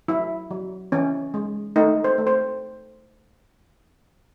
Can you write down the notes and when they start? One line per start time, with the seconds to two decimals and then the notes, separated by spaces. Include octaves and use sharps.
0.08 F#3 E4
0.51 F#3
0.92 E3 C#4
1.34 G#3
1.76 A3 D#4
2.04 C5
2.18 A3
2.27 C5